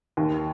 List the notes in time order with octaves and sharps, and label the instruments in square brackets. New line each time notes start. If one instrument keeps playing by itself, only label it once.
[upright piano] D#2